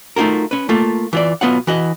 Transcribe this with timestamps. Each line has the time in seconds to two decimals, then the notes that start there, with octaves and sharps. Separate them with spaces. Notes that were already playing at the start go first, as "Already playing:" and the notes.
0.16 A3 D#4 F4 F#4 A#4
0.51 C#4 B4
0.69 A3 A#3 F4 A4
1.13 E3 F4 D5
1.41 B1 G2 B3 F4 C#5 F#5
1.67 E3 F#4 D#5